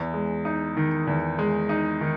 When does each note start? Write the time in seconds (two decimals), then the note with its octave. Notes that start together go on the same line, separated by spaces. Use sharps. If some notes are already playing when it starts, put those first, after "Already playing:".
Already playing: E2
0.14 G#3
0.45 D#4
0.77 D#3
1.07 E2
1.39 G#3
1.69 D#4
2.01 D#3